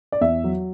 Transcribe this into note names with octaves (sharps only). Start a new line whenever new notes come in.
D5
E2 E5
F#3